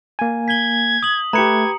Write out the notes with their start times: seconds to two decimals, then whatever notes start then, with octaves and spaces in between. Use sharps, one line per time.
0.19 A#3 G#5
0.48 G#6 B6 G7
1.03 D#6 F#7
1.33 A3 G4 B4 A#5 G#6 C#7